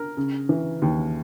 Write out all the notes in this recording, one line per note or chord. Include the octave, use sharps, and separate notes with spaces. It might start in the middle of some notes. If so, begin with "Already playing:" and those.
Already playing: A#4
C#3
E3
D#2